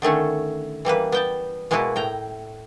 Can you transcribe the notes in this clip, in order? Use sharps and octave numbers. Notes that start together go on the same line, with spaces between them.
D3 D#3 A3 C#4
E3 G3 A#3 B4
B3 G5 A5
B2 G#3 A#3 E4 F#4 B4
A2 G5 A#5